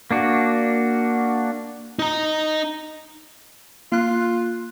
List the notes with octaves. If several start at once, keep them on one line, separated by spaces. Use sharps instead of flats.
A#3 D4 F#4
D#4 A#5
A#3 F4 F#6